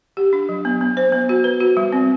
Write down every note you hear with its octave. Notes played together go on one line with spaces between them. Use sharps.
G4
D4
F#3
B3
B3
C5
B3
F#4
B4
F#4
G3
C4